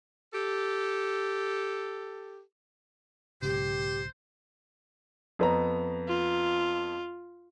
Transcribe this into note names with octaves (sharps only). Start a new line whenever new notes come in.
G4 A4
B1 G#2 C#3 G4 C5
F2 B3 A#5
F4